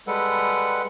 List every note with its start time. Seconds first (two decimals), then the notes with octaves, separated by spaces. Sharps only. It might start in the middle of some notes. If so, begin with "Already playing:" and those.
0.07 G3 G#3 A4 B4 F#5